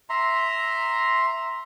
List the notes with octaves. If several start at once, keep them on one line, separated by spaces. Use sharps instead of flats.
E5 A#5 C6